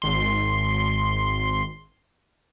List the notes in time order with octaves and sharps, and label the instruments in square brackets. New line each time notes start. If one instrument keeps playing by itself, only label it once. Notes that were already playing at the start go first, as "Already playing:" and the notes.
[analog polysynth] G#1 C6